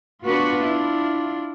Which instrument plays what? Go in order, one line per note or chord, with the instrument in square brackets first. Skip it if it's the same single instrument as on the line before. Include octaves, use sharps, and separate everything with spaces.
[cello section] B3 F#4 B4 [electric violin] D4 F4
[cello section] E4